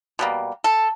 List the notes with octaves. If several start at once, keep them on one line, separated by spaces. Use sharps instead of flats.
B2 G3 A#3
A4